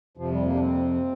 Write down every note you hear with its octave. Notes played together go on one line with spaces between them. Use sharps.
F2 C3 F3
G3
A#3
D4
C4